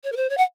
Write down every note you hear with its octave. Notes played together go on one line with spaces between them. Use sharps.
C#5
A#4
C5
C#5
F#5